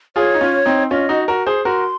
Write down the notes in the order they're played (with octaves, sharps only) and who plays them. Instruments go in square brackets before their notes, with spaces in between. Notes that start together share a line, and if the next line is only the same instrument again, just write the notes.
[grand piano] F4 G#4 [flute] C#5
[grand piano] D#4
C#4 F4
C4 D#4
[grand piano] C#4 F4 [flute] D#5
[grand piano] D#4 F#4
F#4 A#4
G#4 C5
[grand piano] F#4 A#4 [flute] C6